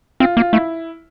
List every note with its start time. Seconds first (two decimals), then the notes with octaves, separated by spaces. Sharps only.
0.20 C4 F4
0.37 A#3 F4
0.53 A3 E4